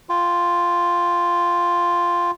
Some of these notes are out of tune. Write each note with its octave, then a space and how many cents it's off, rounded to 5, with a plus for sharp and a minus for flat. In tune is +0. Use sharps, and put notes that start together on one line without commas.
F4 +0 G5 +0